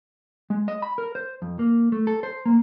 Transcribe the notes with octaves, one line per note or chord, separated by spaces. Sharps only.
G#3
D#5
B5
A#4
C5
F2
A#3
A3
A4
C5
A#3